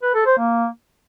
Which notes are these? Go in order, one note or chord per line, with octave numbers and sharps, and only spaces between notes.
B4
A4
C5
A#3